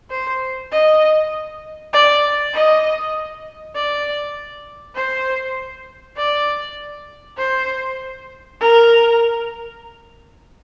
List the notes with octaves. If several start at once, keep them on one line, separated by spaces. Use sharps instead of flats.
C5
D#5
D5
D#5
D5
C5
D5
C5
A#4